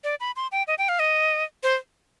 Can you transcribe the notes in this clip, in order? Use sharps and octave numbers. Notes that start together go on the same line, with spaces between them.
D5
B5
C6
G5
D#5
G5
F5
D#5
C5